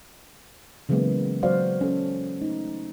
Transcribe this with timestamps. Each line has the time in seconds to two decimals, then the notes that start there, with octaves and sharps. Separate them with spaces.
0.89 C#3 E3 F#3 G#3 A#3 B3
1.43 F#3 F#4 C5 D5 F5 F#5
1.81 C#4 A4
2.41 A3 D#4